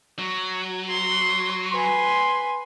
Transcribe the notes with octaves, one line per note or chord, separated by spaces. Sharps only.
F#3
C6
B4 G#5 C6